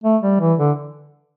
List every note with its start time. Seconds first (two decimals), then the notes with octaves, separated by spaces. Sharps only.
0.04 A3
0.23 G3
0.40 E3
0.59 D3